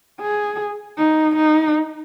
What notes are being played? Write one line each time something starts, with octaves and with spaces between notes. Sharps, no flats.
G#4
D#4
D#4